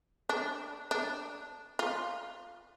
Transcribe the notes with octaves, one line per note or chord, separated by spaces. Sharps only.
D4
D4
F4